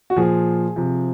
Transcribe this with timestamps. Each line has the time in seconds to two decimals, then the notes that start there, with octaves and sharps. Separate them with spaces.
0.10 F#4
0.17 A#2 F3 G#4
0.76 C3 F3